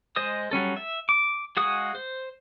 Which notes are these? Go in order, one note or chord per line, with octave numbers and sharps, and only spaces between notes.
G#3 C5 D#5 D#6
F#3 G3 C#4 A4
E5
D6
G#3 F#4 G#4 F5 D#6
C5